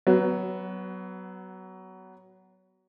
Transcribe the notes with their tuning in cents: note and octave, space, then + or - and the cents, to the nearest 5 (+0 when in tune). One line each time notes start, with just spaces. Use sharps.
F#3 +20 B3 +0